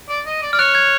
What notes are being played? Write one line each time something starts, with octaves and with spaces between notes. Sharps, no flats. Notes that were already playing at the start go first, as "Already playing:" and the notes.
D5
D#5
D5
D5 F6
C#5 F#6
G#6